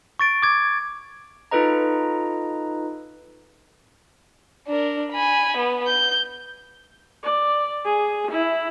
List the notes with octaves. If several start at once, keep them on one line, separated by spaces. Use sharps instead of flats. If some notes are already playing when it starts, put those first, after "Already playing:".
C#6 A6 D7
D6 G#6
D#4 F4 A4 B4 D#5 A#5
D4 A#4
G#5 B5
B3
G6
D5
G#4
E4